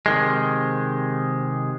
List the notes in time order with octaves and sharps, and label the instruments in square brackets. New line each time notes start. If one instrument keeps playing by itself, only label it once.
[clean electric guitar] C3 D#3 G#3